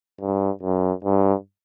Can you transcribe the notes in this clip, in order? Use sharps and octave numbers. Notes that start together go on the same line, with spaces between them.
G2
F#2
G2